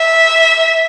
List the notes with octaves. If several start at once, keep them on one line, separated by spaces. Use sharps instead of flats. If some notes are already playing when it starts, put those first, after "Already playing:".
Already playing: E5